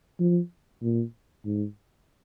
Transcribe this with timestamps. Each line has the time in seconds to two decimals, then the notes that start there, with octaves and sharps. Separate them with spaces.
0.20 F3
0.83 A#2
1.45 G#2